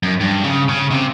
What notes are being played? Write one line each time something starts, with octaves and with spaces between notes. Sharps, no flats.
F#2
G2
C#3
C#3
C3